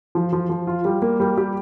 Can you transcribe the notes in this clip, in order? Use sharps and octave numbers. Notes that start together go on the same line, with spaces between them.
F3
F3
F3
F4
G3
A#3
G3
G4